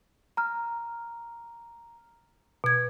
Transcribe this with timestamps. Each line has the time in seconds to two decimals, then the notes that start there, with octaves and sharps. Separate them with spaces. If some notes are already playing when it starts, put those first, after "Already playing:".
0.37 A#5 F6
2.64 B2 G#6